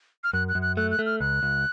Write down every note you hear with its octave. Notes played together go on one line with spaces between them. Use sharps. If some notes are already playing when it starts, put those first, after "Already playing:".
F6
F#2 F#6
F#6
F#2
F#6
A3 F#6
F#6
A3
F6
C#2 F#6
C#2